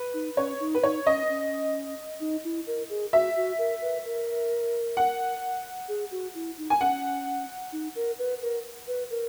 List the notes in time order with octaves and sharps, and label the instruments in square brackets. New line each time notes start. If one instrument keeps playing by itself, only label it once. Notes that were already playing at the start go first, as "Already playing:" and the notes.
Already playing: [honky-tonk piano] B4
[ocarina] D#4
[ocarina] C#4 [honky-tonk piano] C#5
[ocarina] D#4
[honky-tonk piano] B4
[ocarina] D#4 [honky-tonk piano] C#5
[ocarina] C#4 [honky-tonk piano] D#5
[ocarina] C#4
D#4
E4
A#4
G#4
[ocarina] F#4 [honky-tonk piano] E5
[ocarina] F#4
A#4
B4
A#4
[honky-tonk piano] F#5
[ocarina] G#4
F#4
E4
D#4
[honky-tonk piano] G#5
[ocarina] C#4 [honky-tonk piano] F#5
[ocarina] D#4
A#4
B4
A#4
B4
A#4